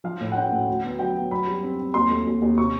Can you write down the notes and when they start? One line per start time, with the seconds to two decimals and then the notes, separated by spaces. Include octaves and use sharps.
0.04 F3 F5
0.21 A2
0.32 F#5
0.36 C#4 G5
0.52 A2
0.68 D2
0.84 B3
0.99 F#3 G5
1.15 B3
1.31 F#2 B5
1.47 G3
1.63 C4
1.79 C4
1.94 D#2 C6
2.10 A3
2.26 D#2
2.42 D#2
2.58 C3 C#6